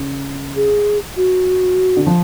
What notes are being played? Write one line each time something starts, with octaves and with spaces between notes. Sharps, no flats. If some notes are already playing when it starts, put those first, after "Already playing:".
Already playing: C#3
G#4
F#4
D3
F3